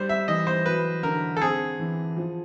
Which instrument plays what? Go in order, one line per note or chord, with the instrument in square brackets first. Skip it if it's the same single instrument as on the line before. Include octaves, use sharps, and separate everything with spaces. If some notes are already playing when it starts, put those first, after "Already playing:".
Already playing: [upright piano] G3 [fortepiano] C5
[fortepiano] E5
[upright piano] E3 [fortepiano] D#5
[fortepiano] C5
[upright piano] F#3 [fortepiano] B4
[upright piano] D3 [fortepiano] A#4
[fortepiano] A4
[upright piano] C4 [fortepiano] G#4
[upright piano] E3
F3